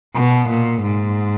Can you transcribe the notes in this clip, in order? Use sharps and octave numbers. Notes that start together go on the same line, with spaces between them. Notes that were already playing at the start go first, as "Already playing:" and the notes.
B2
A#2
G#2